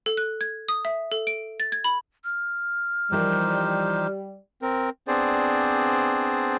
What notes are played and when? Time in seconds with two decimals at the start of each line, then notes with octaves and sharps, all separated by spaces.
0.06 A4
0.17 F#6
0.41 G#6
0.68 D#6
0.85 E5
1.12 A4
1.27 D7
1.60 A6
1.72 G#6
1.84 B5
2.24 F6
3.12 E3 F3 G3 D#4 G4 A#4 C5
4.62 C4 A#4
5.08 B3 C4 D4 G#4 C5 D5